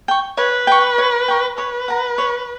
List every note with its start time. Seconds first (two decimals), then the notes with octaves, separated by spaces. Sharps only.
0.08 G5 C#6
0.37 B4 C#5
0.67 G5 C#6
0.98 C#5
1.28 G5 C#6
1.58 B4 C#5
1.88 F#5 A#5
2.18 C#5